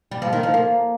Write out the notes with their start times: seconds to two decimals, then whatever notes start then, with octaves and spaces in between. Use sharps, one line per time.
0.11 G3
0.22 F3
0.33 D#3
0.43 F3
0.54 A#3